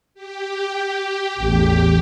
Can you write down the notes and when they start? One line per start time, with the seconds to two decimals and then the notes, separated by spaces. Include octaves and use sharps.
0.14 G4
1.40 A1 E2